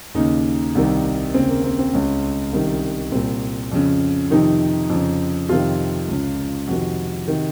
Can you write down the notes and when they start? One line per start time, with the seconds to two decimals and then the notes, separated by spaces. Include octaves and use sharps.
0.14 D#2 C#3 D#4
0.75 C2 C3 D#3
1.34 D#2 C#3 C4
1.49 A#3
1.64 C4
1.79 C4
1.93 C#2 C#3 C#4
2.53 C2 C3 D#3
3.11 C2 A#2 C4
3.72 F2 C#3
4.31 F2 C3 D#3 D#4
4.90 F2 C#3
5.49 F2 C3 D#3 F4
6.08 C#2 C#3
6.68 F2 C3 D#3 F#4
7.28 C3 D#3